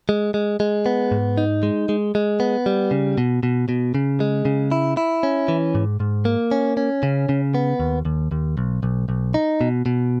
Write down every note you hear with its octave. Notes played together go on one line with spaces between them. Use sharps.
G#3
G#3
G#3
B3
G#2
D#4
G#3
G#3
G#3
B3
G3
C#3
B2
B2
B2
C#3
G#3
C#3
E4
E4
C#4
E3
G#2
G#2
A#3
C#4
C#4
C#3
C#3
B3
D#2
D#2
D#2
B1
B1
B1
D#4
B2
B2